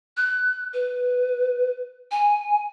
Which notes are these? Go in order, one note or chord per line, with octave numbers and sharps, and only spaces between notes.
F#6
B4
G#5